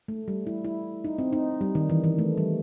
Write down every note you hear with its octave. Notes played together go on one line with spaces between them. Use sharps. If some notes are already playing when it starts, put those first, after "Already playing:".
A3
G3
E4
E4
D#4
C4
D#4
G3
D#3
E3
E3
A3
G3